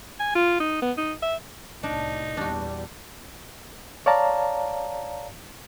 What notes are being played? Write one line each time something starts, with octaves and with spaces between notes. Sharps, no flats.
G#5
F4
D#4
B3
D#4
E5
C2 A2 D4 D#4
E2 A#2 G3 D4 F#4
C#5 D5 F5 A5 A#5